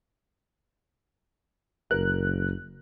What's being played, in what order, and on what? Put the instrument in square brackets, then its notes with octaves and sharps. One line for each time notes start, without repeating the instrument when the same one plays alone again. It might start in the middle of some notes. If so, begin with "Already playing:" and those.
[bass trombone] F#1 [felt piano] A#4 [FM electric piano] F#6